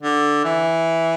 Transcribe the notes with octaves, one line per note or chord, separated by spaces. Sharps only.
D3
E3